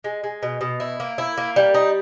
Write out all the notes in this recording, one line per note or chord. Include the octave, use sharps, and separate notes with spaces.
G#3
G#3
B2
B2
E4
A#3
E4
A#3
G3
D#4